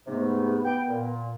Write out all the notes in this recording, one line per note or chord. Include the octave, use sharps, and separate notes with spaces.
G#2 C3 A3 B3
G5
A#2